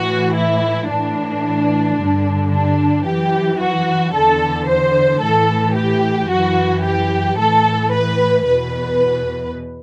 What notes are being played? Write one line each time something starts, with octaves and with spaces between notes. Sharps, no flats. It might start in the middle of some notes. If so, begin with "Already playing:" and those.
Already playing: A2 E3 F#4
E4
A2 E3 D4
G2 D3
D4
F#2 E3 G4
F#4
E2 D3 A4
C5
A2 E3 A4
G4
F#2 E3 F#4
G4
A2 E3 A4
B4
E2 B2 B4